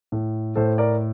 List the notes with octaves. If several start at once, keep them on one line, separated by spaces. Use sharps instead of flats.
A2
A2 A4 C5
A#4 D5